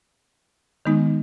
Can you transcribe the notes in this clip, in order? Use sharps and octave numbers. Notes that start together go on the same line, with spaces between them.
D#3 G#3 B3 D#4